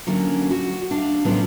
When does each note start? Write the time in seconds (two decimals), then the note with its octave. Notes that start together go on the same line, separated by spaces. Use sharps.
0.07 D3 F#3 A#3 C#4
0.50 F#4
0.91 D4 F5
1.25 A2 C#3 F3 F#3 B3 C#4